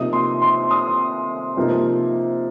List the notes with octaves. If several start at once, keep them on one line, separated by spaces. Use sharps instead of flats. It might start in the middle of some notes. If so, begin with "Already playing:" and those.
Already playing: C3 F3 A#3 D#4 D#6
C6
C6
D#6
C3 F3 A#3 D#4